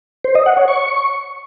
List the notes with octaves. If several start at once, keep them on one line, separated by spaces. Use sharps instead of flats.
C5
D#5
F#5
C#5
C#6